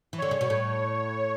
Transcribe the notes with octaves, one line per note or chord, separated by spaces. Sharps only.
E3
D3 C#5
C#3
B2
A2